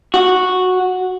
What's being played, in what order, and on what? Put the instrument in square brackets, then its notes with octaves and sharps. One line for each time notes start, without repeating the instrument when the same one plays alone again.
[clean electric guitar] F#4